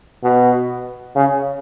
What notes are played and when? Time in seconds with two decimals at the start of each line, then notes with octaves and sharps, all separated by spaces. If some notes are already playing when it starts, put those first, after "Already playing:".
0.23 B2
1.15 C#3